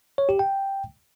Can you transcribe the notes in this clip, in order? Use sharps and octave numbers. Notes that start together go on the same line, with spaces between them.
C#5
G4
G5